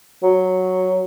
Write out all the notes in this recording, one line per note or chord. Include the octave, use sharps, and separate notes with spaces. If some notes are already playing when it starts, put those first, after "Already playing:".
F#3